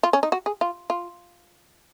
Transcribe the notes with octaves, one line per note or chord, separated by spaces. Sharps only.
F4
C#4
D#4
F#4
G#4
F4
F4